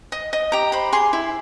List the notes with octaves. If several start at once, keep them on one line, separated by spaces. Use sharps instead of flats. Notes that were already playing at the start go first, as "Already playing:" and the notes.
D#5
D#5
G4 A#5
C5 B5
G#4 C6
E4